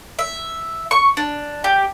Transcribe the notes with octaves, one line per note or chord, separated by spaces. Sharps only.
E5
C#6
D4
G4